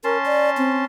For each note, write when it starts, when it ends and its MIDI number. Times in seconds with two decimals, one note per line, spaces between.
0.04 0.85 61
0.04 0.18 70
0.04 0.85 81
0.04 0.85 84
0.26 0.50 74
0.58 0.84 60